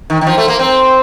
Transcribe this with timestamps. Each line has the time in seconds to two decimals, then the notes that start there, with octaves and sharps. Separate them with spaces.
0.10 D#3
0.21 D#3
0.27 F3
0.38 A3
0.48 A#3
0.59 C4